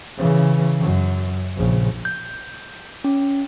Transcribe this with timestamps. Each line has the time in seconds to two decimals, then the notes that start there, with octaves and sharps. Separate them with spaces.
0.17 C#3 E3
0.80 F#2
1.57 A#1 C#3
2.05 G6
3.04 C#4